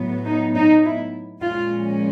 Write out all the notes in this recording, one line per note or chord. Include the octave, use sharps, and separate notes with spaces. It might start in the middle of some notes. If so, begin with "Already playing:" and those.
Already playing: A2 F#3 B3
D#4
D#4
E4
A#2 F3 G#3 C#4 F4